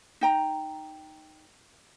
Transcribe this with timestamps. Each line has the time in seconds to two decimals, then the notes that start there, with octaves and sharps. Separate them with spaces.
0.21 D#4 G5 A#5